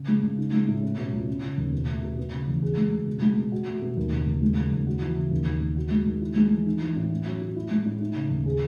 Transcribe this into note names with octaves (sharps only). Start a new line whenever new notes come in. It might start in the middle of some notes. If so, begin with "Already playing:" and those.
Already playing: C#3
G#3
C#3
D#4
G#3
A2
C#4
B2
C#2
C#4
C#3
D#2
B2
A3
B2
B3
C#3
E2
G#4
G#3
C#3
B2
G#3
B2
F#4
A3
B2
D#2
C#3
D#2
G#3
C#3
D#2
F#4
E3
C#3
D#2
D#3
D#2
F#4
G#3
D#3
E4
G#3
E3
D#4
E3
A2
C#4
F#3
A2
E4
G#3
A2
D#4
C#3
D#2
G#4